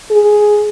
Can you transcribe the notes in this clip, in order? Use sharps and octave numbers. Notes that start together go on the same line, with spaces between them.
G#4